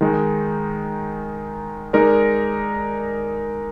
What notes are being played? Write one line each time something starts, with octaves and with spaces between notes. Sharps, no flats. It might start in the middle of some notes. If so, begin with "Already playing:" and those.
D#3 G#3 D#4
G#3 D#4 A#4 D5